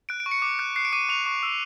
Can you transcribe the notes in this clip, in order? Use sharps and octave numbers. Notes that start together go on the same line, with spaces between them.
F#6 D7
D7
C#6
C#7
D6
F#6
F#6 C7
D7
D6 D#7
C#6 F7
C#6
E6